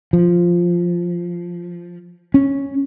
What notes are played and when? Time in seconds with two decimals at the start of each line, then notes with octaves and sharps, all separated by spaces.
0.13 F3
2.34 C#4